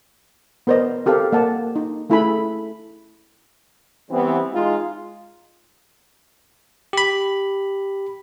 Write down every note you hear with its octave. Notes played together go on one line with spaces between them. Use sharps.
B3 A#4 C5 D5 D#5
C4 G4 A4 A#4 F5
A#3 F#5 A5
D#4
A3 C#4 E4 G#4 A4 B5
E3 G3 B3 C4
G#3 D#4 F4
G4 B5